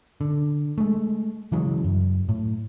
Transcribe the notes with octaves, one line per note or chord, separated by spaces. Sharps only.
D3
G#3 A3
C#3 E3 F#3 G#3
F#2
A2